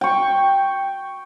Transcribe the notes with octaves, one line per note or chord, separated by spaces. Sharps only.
G5 C#6